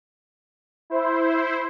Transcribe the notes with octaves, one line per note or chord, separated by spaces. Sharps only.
E4 C5